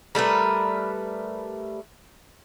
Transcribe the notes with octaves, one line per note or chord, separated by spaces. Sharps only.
G3 A3 A#4 B4